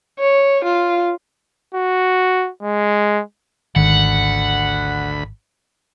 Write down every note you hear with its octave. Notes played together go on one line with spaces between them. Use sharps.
C#5
F4
F#4
G#3
G#1 D2 D#3 F#5 B5